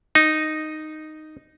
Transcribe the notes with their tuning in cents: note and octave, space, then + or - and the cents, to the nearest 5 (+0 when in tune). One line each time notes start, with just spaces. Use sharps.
D#4 -5